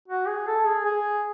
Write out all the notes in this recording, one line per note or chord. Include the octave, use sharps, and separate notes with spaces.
F#4
G#4
A4
G#4
G#4